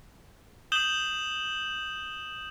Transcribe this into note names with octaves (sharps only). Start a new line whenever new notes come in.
D#6 G6 E7 F#7 G7